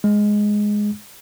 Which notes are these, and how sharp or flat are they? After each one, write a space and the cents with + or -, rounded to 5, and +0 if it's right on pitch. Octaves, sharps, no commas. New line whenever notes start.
G#3 +0